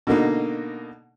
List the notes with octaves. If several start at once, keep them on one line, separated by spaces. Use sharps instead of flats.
B2 D3 A#3 D#4